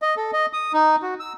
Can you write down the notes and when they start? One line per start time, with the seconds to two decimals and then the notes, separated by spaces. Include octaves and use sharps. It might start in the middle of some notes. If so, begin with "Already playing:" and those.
0.02 D#5
0.17 A4
0.33 D#5
0.53 D#6
0.73 D#4
1.02 F#4
1.20 E6